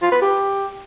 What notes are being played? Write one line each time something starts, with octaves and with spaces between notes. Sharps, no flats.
F4
B4
G4